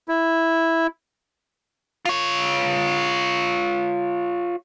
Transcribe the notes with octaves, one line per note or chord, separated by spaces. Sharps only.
E4
F4 C#5